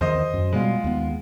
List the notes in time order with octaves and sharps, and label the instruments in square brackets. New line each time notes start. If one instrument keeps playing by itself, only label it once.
[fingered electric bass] E2 D#3 [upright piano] C5 D#5 C6
[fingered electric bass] F#2
[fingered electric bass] B2 G3 B3 [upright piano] G#3 F4
[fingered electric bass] D#2 B3